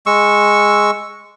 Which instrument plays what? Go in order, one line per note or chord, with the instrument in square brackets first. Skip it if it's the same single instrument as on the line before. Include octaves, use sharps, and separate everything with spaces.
[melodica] G#3 C#6 E6